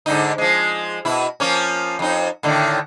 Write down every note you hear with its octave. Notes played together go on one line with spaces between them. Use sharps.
G#2 D3 D#4
F3 G#3
B2 E4
F3 A#3 C#4
F2 D#4
A2 D3 D#3